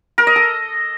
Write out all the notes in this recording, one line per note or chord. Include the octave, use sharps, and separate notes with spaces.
A#4
D#5
A4